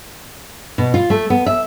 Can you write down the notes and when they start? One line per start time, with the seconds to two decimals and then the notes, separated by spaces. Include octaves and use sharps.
0.78 B2
0.94 F4
1.10 A3
1.30 B3
1.46 E5